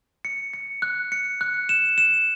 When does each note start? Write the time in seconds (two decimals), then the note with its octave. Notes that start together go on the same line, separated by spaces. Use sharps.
0.25 C#7
0.54 C#7
0.82 F#6
1.12 C#7
1.41 F#6
1.69 E7
1.98 E7